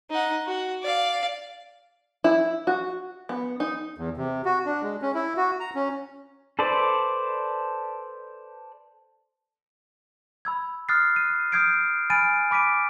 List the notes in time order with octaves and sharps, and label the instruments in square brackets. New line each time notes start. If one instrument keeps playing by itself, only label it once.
[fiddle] D#4 F#5
F#4
D5 F5
[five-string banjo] E4
F#4
B3
D#4
[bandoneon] E2
C3
F#4
D4
G#3
C#4
E4
F#4
A#5
C#4
[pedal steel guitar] A4 B4 C5 D5
[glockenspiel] B5 E6 G#6
D#6 F6 F#6 A6 C7
D#7
D#6 F6 G6 G#6 C7 D7
G#5 B5 F6 A6 D7 D#7
B5 D6 B6 D7 D#7